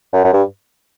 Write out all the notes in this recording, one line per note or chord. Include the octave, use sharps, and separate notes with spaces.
F#2
F#2
G2